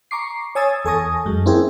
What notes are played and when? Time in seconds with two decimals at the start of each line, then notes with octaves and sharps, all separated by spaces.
0.11 A#5 C#6 D6 C7
0.55 C#5 G#5 D#6 E6 A6
0.85 E2 A4 G#5 C#6 D#6 A#6
1.26 F#2 G#3
1.46 A#3 C4 C#4 E4 G4 G#4